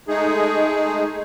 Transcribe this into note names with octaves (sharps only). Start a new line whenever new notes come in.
G#3 A3 D#4 G#4